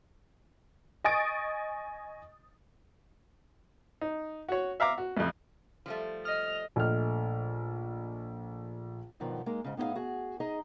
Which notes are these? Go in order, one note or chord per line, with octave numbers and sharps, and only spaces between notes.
D#5 G#5 C#6 D#6 A6 D7
D#4
F#4 C#5
E5 F5 A#5 D6
F#4
A1 F2
F3 G3 A3
D#5 F6
A#1 A3 D#5 F6
E2 G2 B2 D#3 F3
G#3 A#3 D#4
G#2 C#3
A2 B3 D#4 E4 G#4 F5
F#4 G#4
D#4 G#4 D#5 A#5